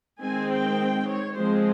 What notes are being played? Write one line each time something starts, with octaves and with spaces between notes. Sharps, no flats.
D#3 G#3 C4 G#5
G5
C#5
F3 G#3 C4 C5